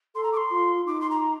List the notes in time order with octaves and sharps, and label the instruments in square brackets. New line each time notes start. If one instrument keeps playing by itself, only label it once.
[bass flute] A4 [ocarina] C6
[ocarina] A#5
D6
C6
[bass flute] F4
[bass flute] D#4 [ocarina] D6
[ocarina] C6
A#5